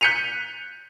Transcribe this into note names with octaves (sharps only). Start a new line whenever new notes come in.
F#6 G6 B6 C#7 D#7 F7